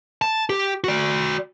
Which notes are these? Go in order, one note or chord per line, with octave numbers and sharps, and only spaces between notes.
A5
G4
F#4 D5